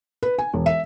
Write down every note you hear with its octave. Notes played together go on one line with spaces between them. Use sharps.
B4
G#5
E1
E5